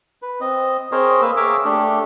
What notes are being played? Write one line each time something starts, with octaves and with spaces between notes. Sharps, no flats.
B4
C4 D#5
C4 G#4 A#4 C5 C#5 D#5
A#3 B4 E6
G#4 A#4 C#5 E5 D6
A3 D4 G4